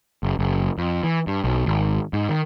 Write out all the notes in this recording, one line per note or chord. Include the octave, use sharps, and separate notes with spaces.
F#1
F#1
F2
E3
G2
B1
G#1
G#2
D#3